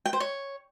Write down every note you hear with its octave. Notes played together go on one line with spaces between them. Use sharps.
G5
C5
C#5